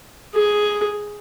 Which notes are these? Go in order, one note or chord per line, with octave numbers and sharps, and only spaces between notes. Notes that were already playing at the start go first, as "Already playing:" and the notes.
G#4